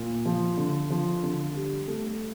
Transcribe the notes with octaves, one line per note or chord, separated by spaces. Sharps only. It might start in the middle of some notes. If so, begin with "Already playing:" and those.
Already playing: A#2
F3
D3
F3
D3
G3
A3